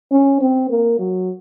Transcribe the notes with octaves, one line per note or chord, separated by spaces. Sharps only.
C#4
C4
A#3
F#3